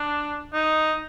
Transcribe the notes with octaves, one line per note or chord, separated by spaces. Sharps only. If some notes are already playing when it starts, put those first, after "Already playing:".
Already playing: D4
D#4